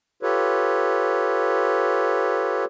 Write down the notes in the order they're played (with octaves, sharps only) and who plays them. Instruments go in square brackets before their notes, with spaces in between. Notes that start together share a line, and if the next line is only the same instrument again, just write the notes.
[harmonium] F4 G4 A4 B4 C#5